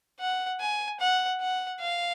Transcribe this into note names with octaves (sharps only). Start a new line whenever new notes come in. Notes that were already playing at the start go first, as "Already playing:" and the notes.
F#5
G#5
F#5
F#5
F5